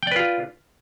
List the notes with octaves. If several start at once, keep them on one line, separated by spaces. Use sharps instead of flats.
F4 B4 D5 G5